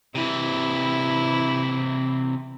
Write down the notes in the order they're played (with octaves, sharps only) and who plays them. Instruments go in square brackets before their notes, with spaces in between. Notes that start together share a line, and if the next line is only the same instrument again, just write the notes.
[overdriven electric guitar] C3 E3 [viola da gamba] E4